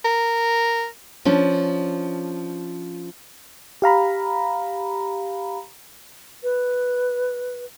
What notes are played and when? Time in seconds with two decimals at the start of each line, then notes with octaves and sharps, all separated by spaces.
0.04 A#4
1.25 F3 C#4 D4
3.82 G4 F5 A#5 B5
6.44 B4